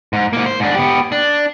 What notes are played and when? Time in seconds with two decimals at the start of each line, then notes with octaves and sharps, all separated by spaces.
0.13 G#2
0.33 G#2 A#3
0.46 C5
0.60 G#2 D4
0.74 B3 G4
1.12 D4